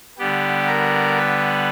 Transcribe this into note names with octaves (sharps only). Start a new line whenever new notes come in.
D3 G3 B3 G4
A#4
B4